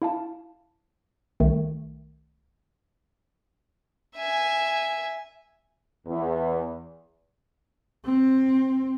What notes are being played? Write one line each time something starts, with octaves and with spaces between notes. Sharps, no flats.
E4 F5 A5
C2 D#3 A3
E5 G#5
E2
C4